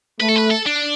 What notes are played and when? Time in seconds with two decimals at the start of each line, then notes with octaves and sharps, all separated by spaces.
0.20 A3 B4
0.29 A4
0.36 B4
0.51 A4
0.67 D4